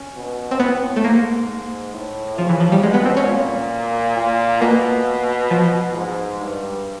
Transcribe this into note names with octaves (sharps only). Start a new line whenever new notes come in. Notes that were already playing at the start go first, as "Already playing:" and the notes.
Already playing: C#4
B2
C4
A2 B3
A3
G#2 A#3
A2
C#3 F3
E3
F3
G3
B2 G#3
B3
C4
C#4
A#2
A#2
B2 A#3
F3
G#2
G2